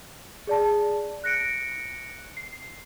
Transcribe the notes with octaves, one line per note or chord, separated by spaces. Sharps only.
G#4 D5 A5
F#6 A#6 C#7 D7
C7